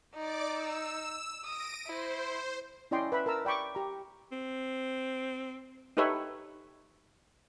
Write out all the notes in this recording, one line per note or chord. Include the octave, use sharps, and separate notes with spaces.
D#4 D5 D6
E6
D#6 A#6 D7 D#7
E4 C5
C#4 E4 D5 D#5 G5 C6
B4 E5 B5
A#4 A5 A#5 E6
D5 G5 B5 C#6 D6
G4 A#5
C4
D#4 G4 A4 B4 C#5 E5